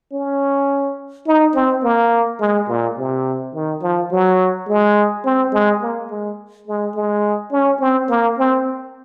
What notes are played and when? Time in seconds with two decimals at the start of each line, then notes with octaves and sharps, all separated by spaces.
0.12 C#4
1.27 D#4
1.54 C4
1.83 A#3
2.40 G#3
2.68 A#2
2.97 C3
3.54 D#3
3.82 F3
4.11 F#3
4.68 G#3
5.25 C4
5.52 G#3
5.82 A#3
6.11 G#3
6.67 G#3
6.95 G#3
7.52 C#4
7.80 C4
8.09 A#3
8.38 C4